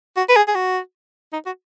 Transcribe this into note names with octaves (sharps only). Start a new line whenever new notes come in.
F#4
B4
G#4
G#4
F#4
D#4
F#4